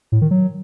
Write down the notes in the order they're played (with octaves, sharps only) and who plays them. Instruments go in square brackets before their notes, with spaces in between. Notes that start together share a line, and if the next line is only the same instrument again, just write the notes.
[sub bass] A2
D#3
F#3